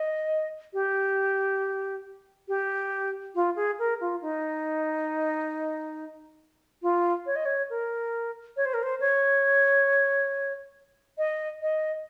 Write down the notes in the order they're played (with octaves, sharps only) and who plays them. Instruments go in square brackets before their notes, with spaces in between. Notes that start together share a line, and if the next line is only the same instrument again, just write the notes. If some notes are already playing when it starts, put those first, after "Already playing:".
Already playing: [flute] D#5
G4
G4
F4
G#4
A#4
F4
D#4
F4
C#5
D#5
C#5
A#4
C#5
C5
A#4
C5
C#5
D#5
D#5